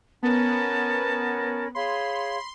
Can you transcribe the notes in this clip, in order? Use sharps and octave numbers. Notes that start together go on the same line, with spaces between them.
B3 C#4 A#4 A5 B5
G#4 C#5 F5 B5 C6